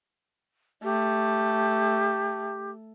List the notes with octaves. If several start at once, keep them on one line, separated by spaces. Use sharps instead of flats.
A3 G4